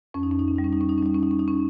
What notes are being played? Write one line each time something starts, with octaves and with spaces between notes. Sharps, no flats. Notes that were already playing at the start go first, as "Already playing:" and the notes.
F2 C#4
D#4
C#4
D#4
C#4
G3 D#4
C#4
D#4
C#4
D#4
C#4
G3 D#4
C#4
D#4
C#4
D#4
C#4